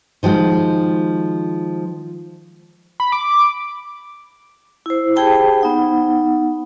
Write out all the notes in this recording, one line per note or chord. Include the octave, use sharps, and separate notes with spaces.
D#3 F3 G#3 F#4
B5
D6
E4 C5
G4 G#4 C5 G5 A5 B5
B3 D#4 F#5